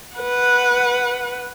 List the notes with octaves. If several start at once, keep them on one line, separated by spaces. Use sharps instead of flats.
B4 F#5